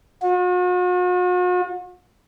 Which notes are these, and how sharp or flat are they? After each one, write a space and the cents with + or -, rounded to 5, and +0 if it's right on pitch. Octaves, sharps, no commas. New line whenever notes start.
F#4 -45